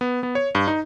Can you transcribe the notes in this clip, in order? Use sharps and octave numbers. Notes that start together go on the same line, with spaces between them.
B3
B3
C#5
G2
D#4